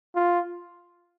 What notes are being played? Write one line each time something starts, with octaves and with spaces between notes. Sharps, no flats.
F4